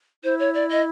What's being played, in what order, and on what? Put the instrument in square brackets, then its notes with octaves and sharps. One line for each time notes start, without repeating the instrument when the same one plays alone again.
[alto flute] E4 [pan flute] C5
[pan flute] C#5
D5
D#5